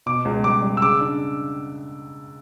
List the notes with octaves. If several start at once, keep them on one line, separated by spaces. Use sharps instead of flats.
B2 D6
C#2
G3 D6
G3
E6
C#3 D6
D4